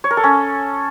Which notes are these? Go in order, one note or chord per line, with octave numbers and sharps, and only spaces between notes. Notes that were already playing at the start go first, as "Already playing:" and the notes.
C#5
A#4
A4
C#4